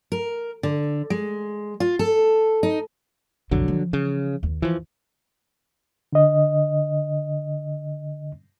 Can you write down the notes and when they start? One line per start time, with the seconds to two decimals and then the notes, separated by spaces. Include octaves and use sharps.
0.12 A#4
0.63 D3
1.10 G#3
1.80 F4
1.99 A4
2.63 D#4
3.51 B1 F2 D3 F#3
3.68 E3 F3
3.93 C#3
4.43 D#2
4.62 E3 F3
6.12 D3 D#5